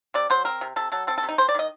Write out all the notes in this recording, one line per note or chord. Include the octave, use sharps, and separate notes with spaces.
C3 D5
F#3 C5
C4 A#4
C3
C3 A4
F#3 A4
C4 A4
A4
C3
D#4
C3 C5
D5
D#3 D#5